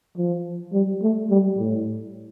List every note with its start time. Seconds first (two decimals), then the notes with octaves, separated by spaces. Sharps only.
0.17 F3
0.73 G3
1.02 A3
1.30 G3
1.58 A2